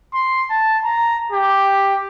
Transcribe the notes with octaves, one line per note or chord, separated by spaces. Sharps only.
C6
A5
A#5
G4